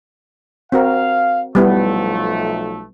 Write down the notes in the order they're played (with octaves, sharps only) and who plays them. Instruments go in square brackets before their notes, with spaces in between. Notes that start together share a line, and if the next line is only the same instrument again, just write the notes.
[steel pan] C4 F#4 A#4 [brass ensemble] F5
[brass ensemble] B1 F3 A3 [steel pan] G3 B3 E4